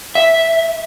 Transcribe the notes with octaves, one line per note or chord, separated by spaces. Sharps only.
E5